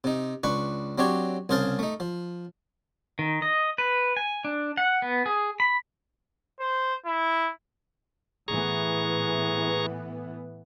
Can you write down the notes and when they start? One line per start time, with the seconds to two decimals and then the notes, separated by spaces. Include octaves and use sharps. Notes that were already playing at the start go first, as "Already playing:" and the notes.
0.04 C3 D#4
0.44 C#2 D4 B4 C#6
0.98 F#3 C4 D4 G4 C#5
1.49 C2 C#3 G#4 C5 F5 A5
1.79 A3 D#4
2.00 F3
3.19 D#3
3.42 D#5
3.78 B4
4.17 G#5
4.45 D4
4.77 F#5
5.02 B3
5.26 G#4
5.60 B5
6.60 C5
7.05 E4
8.48 A2 E3 B3 G#4 A#5 C#6